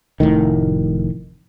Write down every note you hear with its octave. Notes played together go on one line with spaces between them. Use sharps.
F1 B1 A2 D#3